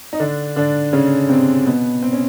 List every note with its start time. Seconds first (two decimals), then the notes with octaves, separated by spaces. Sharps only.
0.13 D#4
0.20 D3 D4
0.56 D3 D4
0.93 C#3 C#4
1.29 C3 C4
1.66 B2 B3
2.03 C4
2.13 C#4